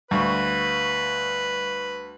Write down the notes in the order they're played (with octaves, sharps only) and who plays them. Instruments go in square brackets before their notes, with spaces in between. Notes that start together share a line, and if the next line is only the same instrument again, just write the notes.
[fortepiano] D2 [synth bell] G3 F5 C#6 [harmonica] B4